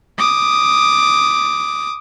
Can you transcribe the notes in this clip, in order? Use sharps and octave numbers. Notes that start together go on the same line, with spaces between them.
D6 D#6